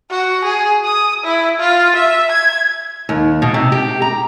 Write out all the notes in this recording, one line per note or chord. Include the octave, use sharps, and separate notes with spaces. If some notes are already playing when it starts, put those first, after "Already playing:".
F#4
G#4
D#6
E4
F4
E5
G#6
D#2
B2
C3
G4
A#5